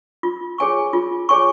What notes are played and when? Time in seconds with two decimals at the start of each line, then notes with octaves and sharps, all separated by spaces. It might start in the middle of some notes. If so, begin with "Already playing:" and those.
0.23 F4
0.58 G#4 C#5 G#5 C#6
0.93 F4
1.29 G#4 C#5 G#5 C#6